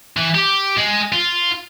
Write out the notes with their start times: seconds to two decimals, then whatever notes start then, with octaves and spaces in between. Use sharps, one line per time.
0.17 E3
0.35 G4
0.77 G#3
1.13 F4